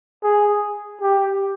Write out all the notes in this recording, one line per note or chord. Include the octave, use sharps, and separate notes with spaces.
G#4
G4